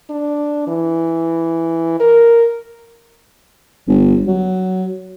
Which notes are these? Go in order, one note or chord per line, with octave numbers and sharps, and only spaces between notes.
D4
E3
A#4
G1
F#3